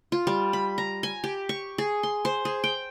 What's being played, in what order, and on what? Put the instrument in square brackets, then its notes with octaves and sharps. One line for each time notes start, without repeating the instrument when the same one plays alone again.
[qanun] F4
G3
B5
A#5
G#5
G4
C#6
G#4
C6
C5
G#4
G5